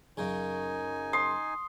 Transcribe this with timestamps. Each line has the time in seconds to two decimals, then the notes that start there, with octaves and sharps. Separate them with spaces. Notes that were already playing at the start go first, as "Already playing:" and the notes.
0.17 F#2 C#3 D#4 G#5
1.13 C6 D#6